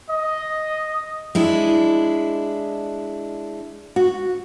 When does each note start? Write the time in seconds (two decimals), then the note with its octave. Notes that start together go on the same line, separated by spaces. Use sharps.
0.10 D#5
1.35 G#3 D4 E4
3.96 F#4